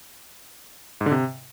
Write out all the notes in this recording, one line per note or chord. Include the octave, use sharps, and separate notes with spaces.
G#2
D3
C3